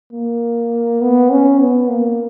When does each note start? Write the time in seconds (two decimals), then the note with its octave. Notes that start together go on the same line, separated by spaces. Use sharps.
0.13 A#3
1.01 B3
1.31 C#4
1.60 B3
1.89 A#3